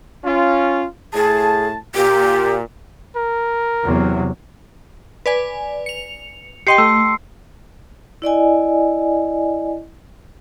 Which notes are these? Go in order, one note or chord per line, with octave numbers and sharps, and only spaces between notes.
C#4 F4
A2 G#4 A5
A#2 G4
A#4
E2 C3 F#3
B4 D5 G#5
C#7 F7
G4 D#5 G5 C6 C7 C#7
A3 E6
E4 D5 D#5 G#5